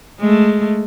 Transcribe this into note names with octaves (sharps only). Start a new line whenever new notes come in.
G#3 A3